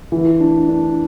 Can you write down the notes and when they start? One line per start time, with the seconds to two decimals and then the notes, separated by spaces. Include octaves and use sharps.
0.12 E3
0.40 D4
0.69 D4